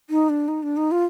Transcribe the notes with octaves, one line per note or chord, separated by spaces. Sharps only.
D#4
D4
D#4
D4
D#4
F4